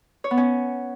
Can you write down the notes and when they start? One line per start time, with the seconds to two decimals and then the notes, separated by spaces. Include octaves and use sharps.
0.24 C#5
0.31 B3
0.37 C#4